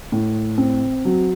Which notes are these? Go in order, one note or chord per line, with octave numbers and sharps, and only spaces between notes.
A2
C4
F#3